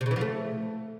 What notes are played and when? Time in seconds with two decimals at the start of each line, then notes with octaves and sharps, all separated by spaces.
0.01 C3
0.06 C#3
0.11 E3
0.16 F3
0.21 A3